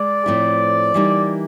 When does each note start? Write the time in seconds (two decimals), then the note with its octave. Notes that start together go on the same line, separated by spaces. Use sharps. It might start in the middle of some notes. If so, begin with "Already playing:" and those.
Already playing: G#3 G#4 D5
0.26 A2 F3 A3 C4 E4
0.94 E3 G3 A#3 D#4